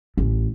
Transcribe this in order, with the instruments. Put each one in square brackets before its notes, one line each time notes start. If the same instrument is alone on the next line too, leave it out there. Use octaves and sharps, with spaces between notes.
[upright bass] A1